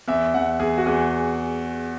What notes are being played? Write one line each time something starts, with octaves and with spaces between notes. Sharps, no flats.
E2 E5
E2 F#5
E2 G#4
F#4
E2 G#4